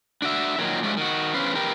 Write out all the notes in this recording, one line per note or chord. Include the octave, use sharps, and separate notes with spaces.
D4 F#4 E5
A#2 D#3 F#3
F3 F#3 G#3 A3 D4
D#3 F#4
E2 C#4 B4 C5 F5
G4 A#4 B4 G5